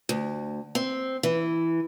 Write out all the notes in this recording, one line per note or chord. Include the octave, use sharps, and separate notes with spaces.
D2
C4
E3